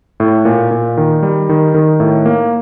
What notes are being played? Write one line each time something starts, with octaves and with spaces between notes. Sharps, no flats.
A2
A#2
A#2
D#3
G3
D#3
D#3
A2
A#3